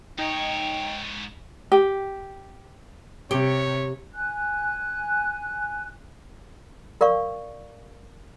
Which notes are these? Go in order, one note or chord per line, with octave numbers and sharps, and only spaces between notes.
G#2 D#4 C#5 G5
G4
C3 G4 C#5
G#5 F#6
A#4 D5 F5 C#6